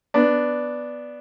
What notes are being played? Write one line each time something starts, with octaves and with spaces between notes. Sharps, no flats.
B3 D4